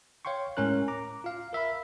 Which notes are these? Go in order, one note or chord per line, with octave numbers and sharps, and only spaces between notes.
C#5 F5 G5 C6 C#6
A2 G#3 C#4 A#4 F#6
A#5 D6
F4 F5
A#4 E5 F5 B5